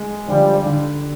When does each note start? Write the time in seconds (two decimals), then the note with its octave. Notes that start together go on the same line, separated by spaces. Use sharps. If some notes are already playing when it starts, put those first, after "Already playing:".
Already playing: G#3
0.28 D3 F3 G3
0.66 D3